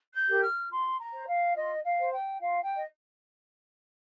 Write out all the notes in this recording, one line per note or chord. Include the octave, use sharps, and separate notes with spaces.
G6
G4 A#4
F6
F4 C6
A#5
C5
F5
F4 D#5
F5
C5
G5
F4 F5
G5
D#5